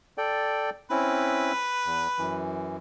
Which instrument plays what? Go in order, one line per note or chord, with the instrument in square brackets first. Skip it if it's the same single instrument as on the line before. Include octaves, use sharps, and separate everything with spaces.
[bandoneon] A4 D5 G5
[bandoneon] C4 C#4 E4 [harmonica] B4
[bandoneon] E2
F#2 E3